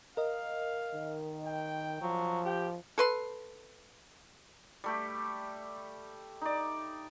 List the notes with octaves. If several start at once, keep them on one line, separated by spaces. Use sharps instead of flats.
A#4 D#5 F5
D#3
G5
F3 F#3
G4 G5
A4 B4 C6
G3 A3 G4
D#4 D5